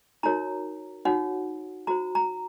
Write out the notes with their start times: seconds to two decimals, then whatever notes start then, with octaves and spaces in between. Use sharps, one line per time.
0.23 D#4 F#4 A#4 C#5 A#5
1.05 D#4 F#4 C#5 F#5
1.87 F#4 C5 A#5
2.15 A#5